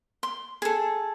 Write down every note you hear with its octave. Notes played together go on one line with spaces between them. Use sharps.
C6
G#4 A4